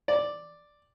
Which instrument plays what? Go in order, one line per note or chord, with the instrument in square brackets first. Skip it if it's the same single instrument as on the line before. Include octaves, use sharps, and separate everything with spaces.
[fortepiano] D5